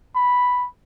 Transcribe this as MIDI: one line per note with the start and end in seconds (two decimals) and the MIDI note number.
0.15 0.67 83